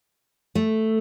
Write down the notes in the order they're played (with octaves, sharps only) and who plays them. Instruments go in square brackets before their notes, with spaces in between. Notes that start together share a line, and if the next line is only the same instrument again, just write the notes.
[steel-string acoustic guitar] A3